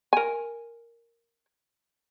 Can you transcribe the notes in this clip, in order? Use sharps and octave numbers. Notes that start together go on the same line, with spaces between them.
A#4 G#5